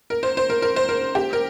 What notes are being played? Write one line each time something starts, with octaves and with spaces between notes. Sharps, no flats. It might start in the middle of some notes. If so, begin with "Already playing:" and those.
A#4
C5
C5
A#4
A#4
C5
A#4
G4
A#4